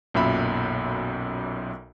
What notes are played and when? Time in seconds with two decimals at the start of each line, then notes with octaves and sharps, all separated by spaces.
0.14 B1 F#2 A#2 E5 B5